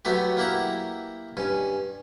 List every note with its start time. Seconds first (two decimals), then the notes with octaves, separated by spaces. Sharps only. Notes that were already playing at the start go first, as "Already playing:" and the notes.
0.05 F#3 A3 B3 F#4 G4
0.37 A#3 E4 G4 F#5 A#5
1.37 G2 C#4